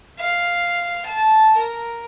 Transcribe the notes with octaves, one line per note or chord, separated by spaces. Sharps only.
F5
A5
A#4